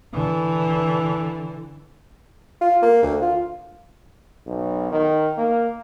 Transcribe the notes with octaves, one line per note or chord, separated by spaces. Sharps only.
D3 E3
F4
A#3
D2
F4
B1
D#3
A#3